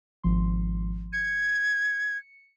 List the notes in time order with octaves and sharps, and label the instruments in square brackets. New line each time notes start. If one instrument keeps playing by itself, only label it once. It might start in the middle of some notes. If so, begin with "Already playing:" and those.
[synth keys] G#1 F3 C6
[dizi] G#6 [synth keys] C#7